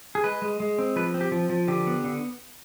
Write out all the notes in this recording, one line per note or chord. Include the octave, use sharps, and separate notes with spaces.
G#4
G#3 B4
G#3
G#3
C4
F3 B4
C4
G4
F3
F3
D3 G4
B3
D3